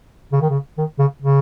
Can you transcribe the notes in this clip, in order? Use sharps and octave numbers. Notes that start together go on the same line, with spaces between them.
C#3
D#3
C#3
D#3
C#3
C#3